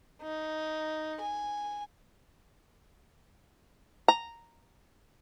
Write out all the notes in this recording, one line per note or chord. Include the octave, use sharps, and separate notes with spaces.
D#4
G#5
A#5